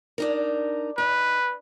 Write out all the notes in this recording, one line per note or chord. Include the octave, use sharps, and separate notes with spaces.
D4 D#4 A#4
D#4 B4